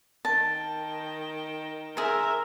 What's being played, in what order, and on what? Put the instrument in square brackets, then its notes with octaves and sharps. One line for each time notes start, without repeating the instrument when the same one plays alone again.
[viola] D#3 G5 [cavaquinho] A5
[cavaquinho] G#4 C5 [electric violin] A#4 E5